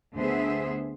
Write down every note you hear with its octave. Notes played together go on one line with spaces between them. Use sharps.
D2 D3 B3 G#4 C5 E5